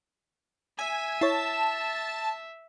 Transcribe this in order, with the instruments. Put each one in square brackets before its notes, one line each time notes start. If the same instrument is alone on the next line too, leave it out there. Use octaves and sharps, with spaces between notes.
[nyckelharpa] E5 [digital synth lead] G#5
[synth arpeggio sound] E4 C#5 [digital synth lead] A5